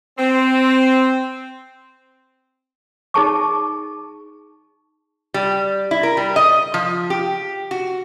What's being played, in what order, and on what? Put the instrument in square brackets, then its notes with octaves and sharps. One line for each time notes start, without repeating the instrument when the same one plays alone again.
[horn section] C4
[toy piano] D#4 G#4 A5 C#6
[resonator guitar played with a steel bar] G3
E4
A#4
G3
D#5
F3
G4
F#4